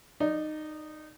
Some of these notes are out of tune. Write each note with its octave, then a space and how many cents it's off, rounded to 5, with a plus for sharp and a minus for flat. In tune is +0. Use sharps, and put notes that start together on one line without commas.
D#4 -15 D5 +0